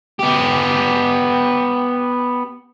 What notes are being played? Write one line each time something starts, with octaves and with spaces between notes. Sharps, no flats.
B3 G4